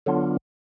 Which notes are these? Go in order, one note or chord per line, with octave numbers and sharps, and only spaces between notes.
D3 F#3 B3 D4 F4